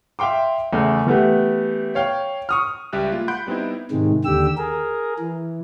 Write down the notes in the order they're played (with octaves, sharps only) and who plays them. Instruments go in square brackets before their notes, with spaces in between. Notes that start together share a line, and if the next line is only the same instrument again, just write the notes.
[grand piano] E5 F5 G5 C6 D6
E2 C#3 A3
E3 A3 B3 G4
C#5 F5 G5
C#6 D#6 F6
[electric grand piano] C#2 G3 G4 E5 F#6
G#3 A#3 F4
F#5 B5 C6 F#6 G6 D7
G3 B3 C4 D#4 E4
[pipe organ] G#2 C3 D#3 G#3
D#2 D3 G4 E6
G#4 A#4
E3